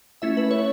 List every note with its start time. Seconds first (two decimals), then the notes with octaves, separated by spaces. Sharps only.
0.22 A3 C#4 E4 E5
0.37 B4
0.51 C#5